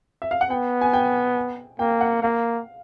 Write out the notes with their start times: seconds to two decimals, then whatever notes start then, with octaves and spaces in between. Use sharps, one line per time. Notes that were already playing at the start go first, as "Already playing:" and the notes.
0.22 E5
0.31 F5
0.41 F#5
0.50 B3 G5
0.81 G#5
0.93 G5
1.79 A#3 G5
2.01 F#5
2.22 A#3 F5